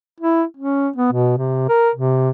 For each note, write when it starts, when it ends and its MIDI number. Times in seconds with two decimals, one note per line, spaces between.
0.20 0.44 64
0.57 0.89 61
0.96 1.12 59
1.12 1.34 47
1.38 1.65 48
1.69 1.90 70
1.95 2.30 48